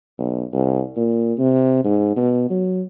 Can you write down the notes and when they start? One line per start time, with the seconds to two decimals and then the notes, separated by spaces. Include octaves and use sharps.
0.19 B1
0.53 C2
0.97 A#2
1.39 C3
1.85 G#2
2.17 B2
2.50 F#3